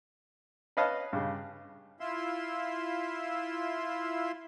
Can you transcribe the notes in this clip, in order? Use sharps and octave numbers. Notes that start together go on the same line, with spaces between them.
B4 C#5 D#5 F5 A5
G2 C#3
E4 F4 E5 C6